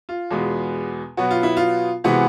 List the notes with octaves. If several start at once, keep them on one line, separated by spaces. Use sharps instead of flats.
F4
E2 B2 G#3 B3
B2 F#3 B3 F#4
F4
E4
F4
C3 E3 G#3 B3 F#4